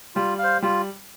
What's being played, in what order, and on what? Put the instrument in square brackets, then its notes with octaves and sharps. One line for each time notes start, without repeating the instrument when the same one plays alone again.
[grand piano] G3 [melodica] F4
[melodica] C5 F5
[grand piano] G3 [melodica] F4